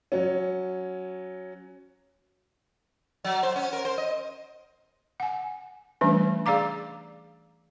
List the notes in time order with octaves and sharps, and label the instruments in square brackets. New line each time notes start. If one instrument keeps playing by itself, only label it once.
[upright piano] F#3 C#4
[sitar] F#3
C5
C#4
A#4
C5
D#5
[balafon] F#5 G#5
E3 G3 A3 C#4 D4 B4
G#4 D5 F5 A#5 D6